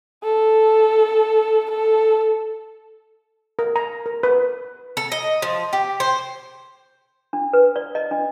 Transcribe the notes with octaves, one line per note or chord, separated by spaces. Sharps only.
A4
A4
A#4
A#5
A#4
B4
A4
D#5
F3
G4
C5
D4
B4
D5
D#5
D4